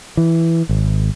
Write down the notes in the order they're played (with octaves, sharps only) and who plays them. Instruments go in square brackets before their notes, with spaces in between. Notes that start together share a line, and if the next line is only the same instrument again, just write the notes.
[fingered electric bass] E3
G#1